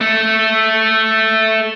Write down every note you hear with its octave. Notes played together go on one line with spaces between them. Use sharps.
A3 A4